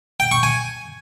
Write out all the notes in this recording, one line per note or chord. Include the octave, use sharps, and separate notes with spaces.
G5
C#6
G#5